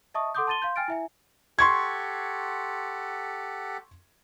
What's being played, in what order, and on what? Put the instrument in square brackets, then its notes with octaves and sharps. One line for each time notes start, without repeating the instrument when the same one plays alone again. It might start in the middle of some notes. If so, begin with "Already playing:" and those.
[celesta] D#5 E5 A5 C#6 D#6
A4 F#5 C6 D6 D#6 G6
A5 C6 A6 D#7 G7
F5 C6 G6
G5 G#5 F6 A6 D7
E4 E5 G#5
[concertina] G4 A4 F#5 [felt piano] C6 C#6 G#6